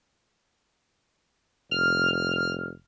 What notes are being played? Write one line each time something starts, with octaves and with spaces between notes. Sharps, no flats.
F1 F6